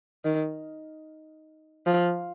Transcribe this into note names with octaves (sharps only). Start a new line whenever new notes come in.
D#3
F3